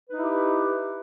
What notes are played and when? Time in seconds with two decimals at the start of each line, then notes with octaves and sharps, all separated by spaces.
0.07 B4
0.12 D#4
0.17 E4
0.21 G4